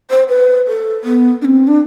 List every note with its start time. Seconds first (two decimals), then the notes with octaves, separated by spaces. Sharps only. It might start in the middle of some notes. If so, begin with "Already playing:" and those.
0.10 C5
0.29 B4
0.67 A4
1.04 B3
1.42 D4
1.45 C4
1.67 D4